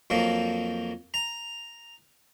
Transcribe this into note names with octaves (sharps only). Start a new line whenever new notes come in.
F2 F3 F#3 A#3
A#5